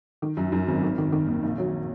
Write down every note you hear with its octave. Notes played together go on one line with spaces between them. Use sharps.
D#3
F#2
F#2
G#1
D#3
D#3
D#3
D#2
A#1
F#3